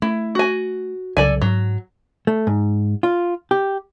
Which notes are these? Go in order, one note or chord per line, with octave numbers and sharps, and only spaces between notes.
A3 E4
F#4 G#5
C2 C#3 F#3 A4 D5 G#5
G#2 F#3
A3
G#2
F4
G4